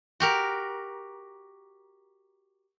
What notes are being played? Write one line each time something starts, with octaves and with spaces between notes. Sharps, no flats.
F#4 G4 A#4